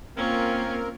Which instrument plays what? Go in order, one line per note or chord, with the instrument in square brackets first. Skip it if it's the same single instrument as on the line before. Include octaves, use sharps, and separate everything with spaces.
[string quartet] A#3 F4 [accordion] C4 A#4 [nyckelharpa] C#4